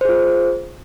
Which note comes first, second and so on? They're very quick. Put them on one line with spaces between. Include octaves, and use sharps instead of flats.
C5 G#4 F4